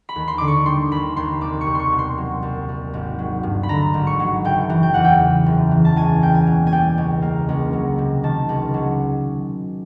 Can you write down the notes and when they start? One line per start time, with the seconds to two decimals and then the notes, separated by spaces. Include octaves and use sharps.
0.09 B5
0.16 D#2
0.28 C6
0.38 D3 D6
0.48 C#6
0.66 G3 C6
0.91 D#2 B5
1.16 D#2 C6
1.41 C2 D6
1.61 C#6
1.66 C2
1.75 C6 C#6
1.92 B2
1.99 C6
2.18 F#3
2.43 C2
2.69 C2
2.94 G#1
3.19 F#3
3.43 G2
3.63 B5
3.69 D3 A#5
3.94 G#1
4.07 C#6
4.20 F#3
4.45 F#1 G5
4.70 E3
4.83 G5
4.94 E2 F#5
5.04 G5
5.20 C#3
5.46 F#1
5.71 E3
5.85 A5
5.96 C#2 G#5
6.22 A#3 G5
6.34 G#5
6.47 B2
6.67 G#5
6.72 G3 G5
6.98 C#2
7.22 A#3
7.49 C#2
7.73 F#3
7.98 C3
8.23 D#3 A5
8.49 C#2
8.74 F#3